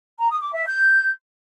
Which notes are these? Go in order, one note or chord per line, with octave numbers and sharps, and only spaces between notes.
A#5
D#6
D6
E5
G6